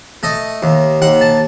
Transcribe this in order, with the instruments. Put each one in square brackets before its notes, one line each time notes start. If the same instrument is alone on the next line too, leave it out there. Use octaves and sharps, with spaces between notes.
[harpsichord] A3 D#5
D#2
D#2 F#5
A5